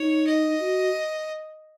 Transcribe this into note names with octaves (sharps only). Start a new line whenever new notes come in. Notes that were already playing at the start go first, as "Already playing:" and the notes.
Already playing: D#4 C#5
D#5
F#4